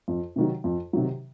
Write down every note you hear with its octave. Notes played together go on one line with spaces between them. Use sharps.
F2
C3 D#3 F#3
F2
C3 D#3 F#3